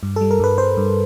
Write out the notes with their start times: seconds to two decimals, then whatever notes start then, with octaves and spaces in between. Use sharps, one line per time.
0.03 G2
0.16 G3 A4
0.31 A#4
0.40 G2 B4
0.58 G2 C5
0.77 G2